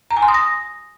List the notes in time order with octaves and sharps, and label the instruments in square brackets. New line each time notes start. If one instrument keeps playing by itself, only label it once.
[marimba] A#5
G#5
C6
D#6
A#6